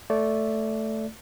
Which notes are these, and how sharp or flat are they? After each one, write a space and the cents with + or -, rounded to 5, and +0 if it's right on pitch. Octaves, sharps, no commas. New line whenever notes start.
A3 +0 D5 -15